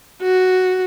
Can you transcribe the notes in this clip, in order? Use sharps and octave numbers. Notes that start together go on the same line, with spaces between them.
F#4